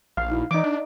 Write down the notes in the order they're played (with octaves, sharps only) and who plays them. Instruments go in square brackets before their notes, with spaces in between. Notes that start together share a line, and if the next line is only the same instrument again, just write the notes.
[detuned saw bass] A#1 [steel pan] F5
[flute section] D#4 E4 F#4
[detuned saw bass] E3 [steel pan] D#4 D6 [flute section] D5
[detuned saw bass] D4